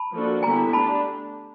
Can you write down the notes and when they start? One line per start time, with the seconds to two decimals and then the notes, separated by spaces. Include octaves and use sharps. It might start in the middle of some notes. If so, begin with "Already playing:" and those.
Already playing: A5 B5
0.13 F3 A#3 D4 F#4 A4
0.43 D3 G3 B3 E4 G4 G#5 A#5
0.73 A3 D4 G4 A5 B5